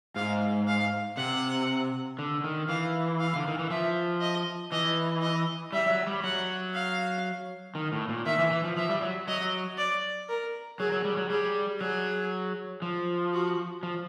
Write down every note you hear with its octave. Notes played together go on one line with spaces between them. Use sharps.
G#2 F5
F5
C3 F#5
D3
D#3
E3 F5
F5
D3
D#3
E3
F3 E5
D#5
E3 D#5
D#5
G3 E5
F#3
G3
F#3 F#5
F5
D#3
A2
A#2
D#3 E5
E3
E3
F3
F3 E5
G3
F#3
F#3 D#5
D5
A#4
F#3 G#4
F#3
G3
F#3
G3 G#4
F#3 G#4
F3
F#4
F3